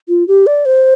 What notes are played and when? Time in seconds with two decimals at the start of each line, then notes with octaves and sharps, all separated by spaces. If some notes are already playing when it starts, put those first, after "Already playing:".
0.09 F4
0.28 G4
0.47 D5
0.66 C5